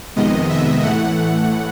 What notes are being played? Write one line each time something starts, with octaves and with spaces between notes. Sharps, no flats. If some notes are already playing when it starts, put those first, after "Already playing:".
F2 C3 D#3 G#3 B3 D#5
E5
A2 E3 A3 F#5